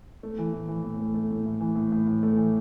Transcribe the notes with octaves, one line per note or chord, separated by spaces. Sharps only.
A3
E3
A2
E3
A2
A3
A3
A2
A2
E3
A2
A2
A2
A3
E3